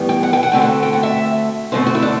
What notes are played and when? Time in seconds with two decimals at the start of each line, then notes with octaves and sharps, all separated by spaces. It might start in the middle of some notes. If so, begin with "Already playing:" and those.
Already playing: A2 E3 G3 B3
0.09 G5
0.23 F#5
0.33 G5
0.43 F#5
0.52 D2 D3 A3 C4 G5
0.62 F#5
0.83 G5
0.93 F#5
1.03 E5
1.72 F#2 D3 A3 C4 C5
1.86 F#4
1.95 E4
2.02 D4